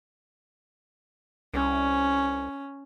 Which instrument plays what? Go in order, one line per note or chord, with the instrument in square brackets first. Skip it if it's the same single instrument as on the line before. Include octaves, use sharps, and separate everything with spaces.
[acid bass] C2 [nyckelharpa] C#4